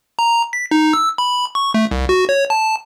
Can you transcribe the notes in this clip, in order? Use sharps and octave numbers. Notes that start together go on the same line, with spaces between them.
A#5
B6
D#4
E6
B5
C#6
A3
C2
F#4
C#5
A5